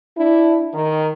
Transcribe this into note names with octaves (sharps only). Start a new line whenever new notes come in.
D4 E4
D#3